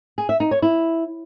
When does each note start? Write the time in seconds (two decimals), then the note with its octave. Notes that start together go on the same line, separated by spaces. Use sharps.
0.18 G#4
0.29 E5
0.40 D#4
0.51 C#5
0.62 E4